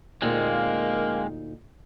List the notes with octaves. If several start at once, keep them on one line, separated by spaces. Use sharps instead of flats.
D2 A#2 G#3 A#3 C4 D#4 F5